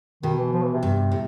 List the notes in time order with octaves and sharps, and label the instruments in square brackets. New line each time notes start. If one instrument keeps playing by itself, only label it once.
[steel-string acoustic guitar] B2 [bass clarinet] D#3
[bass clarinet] E3
F3
E3
C3
[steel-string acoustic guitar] G2
A2